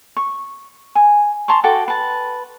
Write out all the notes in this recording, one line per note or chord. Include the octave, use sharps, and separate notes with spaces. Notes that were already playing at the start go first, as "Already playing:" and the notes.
C#6
G#5
A5 A#5 C6 C#6
F#4 A4 G5 D6
B4 A5